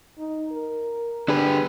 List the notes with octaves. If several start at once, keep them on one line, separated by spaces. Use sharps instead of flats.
D#4
A#4
D3 D4 G4 G#4 B4